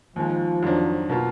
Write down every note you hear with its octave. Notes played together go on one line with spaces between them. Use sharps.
D#2 D#3 F3 G#3
F2 D#3 F#3 D4
B2 A#3 F4